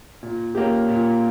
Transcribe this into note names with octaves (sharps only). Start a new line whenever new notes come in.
A#2
A#3 C#4 G4
A#2